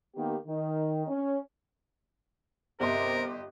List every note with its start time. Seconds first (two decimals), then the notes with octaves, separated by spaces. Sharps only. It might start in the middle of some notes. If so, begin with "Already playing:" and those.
0.15 D#3 A#3 B3 G4
0.47 D#3
1.08 C#4
2.80 G1 C3 G4 A#4 D#5 C6